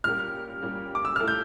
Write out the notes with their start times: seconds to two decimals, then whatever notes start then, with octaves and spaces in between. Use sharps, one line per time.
0.04 A#2 G3 C#4 G4 A#4 F6
0.62 A#2 G3 C#4 G4 A#4
0.95 D6
1.05 E6
1.16 A#2 A3 E4 A4 F6
1.28 G6